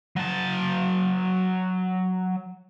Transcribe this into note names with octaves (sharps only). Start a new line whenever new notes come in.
F#3 A5